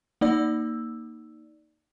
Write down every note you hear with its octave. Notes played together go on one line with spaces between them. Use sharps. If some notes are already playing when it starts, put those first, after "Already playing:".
A#3 D#4 D5 E6